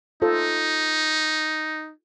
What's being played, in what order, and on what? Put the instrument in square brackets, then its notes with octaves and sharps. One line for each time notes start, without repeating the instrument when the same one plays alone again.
[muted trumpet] D#4 [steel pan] F4 A4 C5